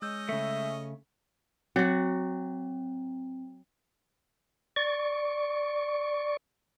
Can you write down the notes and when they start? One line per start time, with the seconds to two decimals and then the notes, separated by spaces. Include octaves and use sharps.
0.02 G#3 C#4 D#5 E6 G6
0.29 C#3 A3 E5
1.76 F#3 C4 F#4
4.76 D5 C#6